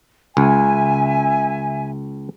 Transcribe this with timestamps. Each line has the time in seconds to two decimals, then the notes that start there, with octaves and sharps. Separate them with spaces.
0.37 C#2 E5 G#5